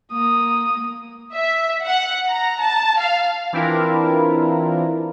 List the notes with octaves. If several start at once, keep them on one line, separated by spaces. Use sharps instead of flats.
A#3 D#6
E5
F#5
A#5
A5
F5
E3 C4 D4 E4 F4 A#4